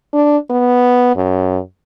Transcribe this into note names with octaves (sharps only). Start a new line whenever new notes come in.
D4
B3
F#2